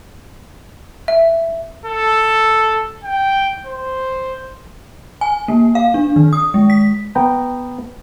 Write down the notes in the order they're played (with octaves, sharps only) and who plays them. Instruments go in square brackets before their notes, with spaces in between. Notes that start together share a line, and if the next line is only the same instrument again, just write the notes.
[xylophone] E5
[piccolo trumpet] A4
G5
C5
[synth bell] G#5
A#3
F5
D4
D#3
D#6
G#3
B6
[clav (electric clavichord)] B3 G5 A#5